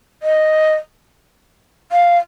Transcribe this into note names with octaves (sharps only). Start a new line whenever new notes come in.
D#5
F5